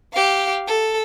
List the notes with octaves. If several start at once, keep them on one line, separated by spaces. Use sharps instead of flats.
G4 F5
A4